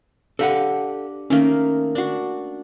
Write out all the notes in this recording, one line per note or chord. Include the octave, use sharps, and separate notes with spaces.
D4 G4 A4 F5 F#5
D#3 A3 A#3 C#4
D4 F#4